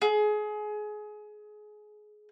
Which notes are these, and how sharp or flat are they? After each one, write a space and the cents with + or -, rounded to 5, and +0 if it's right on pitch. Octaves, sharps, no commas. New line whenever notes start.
G#4 +25